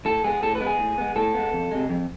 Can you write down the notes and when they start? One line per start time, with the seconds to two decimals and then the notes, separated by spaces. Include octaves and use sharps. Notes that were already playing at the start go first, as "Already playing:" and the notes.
0.05 A2 A4
0.24 G#3 B3 G#4
0.43 A2 A4
0.55 B4
0.60 G#3 B3
0.67 G#4
0.78 A2
0.98 G#3 B3
1.16 A2 A4
1.34 G#3 B3
1.53 F2
1.71 C3 G#3
1.90 F2